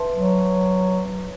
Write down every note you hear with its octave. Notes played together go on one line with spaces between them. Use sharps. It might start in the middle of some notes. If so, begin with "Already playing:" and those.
Already playing: B4 E5 A5 C6
F#3